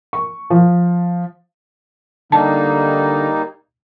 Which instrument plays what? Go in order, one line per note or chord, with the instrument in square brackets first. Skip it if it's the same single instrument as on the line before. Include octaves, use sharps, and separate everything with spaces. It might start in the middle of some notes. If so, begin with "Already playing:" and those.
[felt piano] C#6
F3
[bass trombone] D3 [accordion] G3 A#3 D#4 [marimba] A5